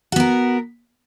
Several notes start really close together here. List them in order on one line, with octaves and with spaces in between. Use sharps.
F#4 B3 A#4